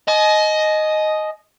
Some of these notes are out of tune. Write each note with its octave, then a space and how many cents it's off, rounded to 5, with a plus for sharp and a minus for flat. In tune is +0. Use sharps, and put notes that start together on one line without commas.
D#5 +0 G#5 +45